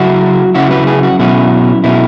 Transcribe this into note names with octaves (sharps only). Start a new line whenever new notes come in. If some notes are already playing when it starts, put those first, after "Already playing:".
Already playing: C#3 F#3 C#4 E4 F#4
C#3 F#3 C#4 E4 F#4
B4
G#4
F#4
B2 F#3 C#4 E4
B2 F#3 C#4 E4